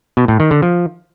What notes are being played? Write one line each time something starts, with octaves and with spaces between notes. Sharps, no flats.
B2
A2
D#3
D3
F3